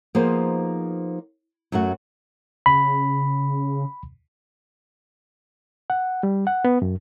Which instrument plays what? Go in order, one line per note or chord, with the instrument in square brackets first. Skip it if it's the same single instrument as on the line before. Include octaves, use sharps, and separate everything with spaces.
[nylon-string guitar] F3 A#3 B3 D#4 G#4 C5
F#2 F#3 A3 F#4
[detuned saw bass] C#3 [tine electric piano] B5
[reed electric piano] F#5
G3
F#5
B3
F#2